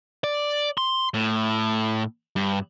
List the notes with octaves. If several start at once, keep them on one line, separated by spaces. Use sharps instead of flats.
D5
C6
A2
G2